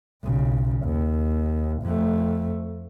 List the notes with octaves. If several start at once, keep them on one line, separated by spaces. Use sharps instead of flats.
B1 C#3
D#2
F2 A3